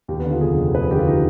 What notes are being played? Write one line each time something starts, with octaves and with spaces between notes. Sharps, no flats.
D#2 G4
B3
D3
F4
F1 G#4
F1
D#2 B4
G#4
D3 G4
F4
D#4